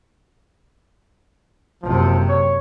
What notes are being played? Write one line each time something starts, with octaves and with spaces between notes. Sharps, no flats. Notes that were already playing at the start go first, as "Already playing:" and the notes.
F#1 C3 F3
C#5